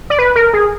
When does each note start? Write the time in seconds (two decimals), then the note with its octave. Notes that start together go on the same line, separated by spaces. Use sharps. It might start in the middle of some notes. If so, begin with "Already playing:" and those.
0.10 D5
0.19 B4
0.36 A#4
0.53 G#4